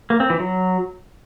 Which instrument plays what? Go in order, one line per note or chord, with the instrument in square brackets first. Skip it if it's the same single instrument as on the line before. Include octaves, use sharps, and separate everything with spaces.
[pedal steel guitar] A#3
C4
E3
F#3